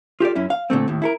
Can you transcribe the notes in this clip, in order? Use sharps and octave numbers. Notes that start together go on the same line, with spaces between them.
F4 G4 A4 D5
F#2 C#4 E4
F5
A#2 D3 A3 C4
D#2 A2
E4 A4 A#4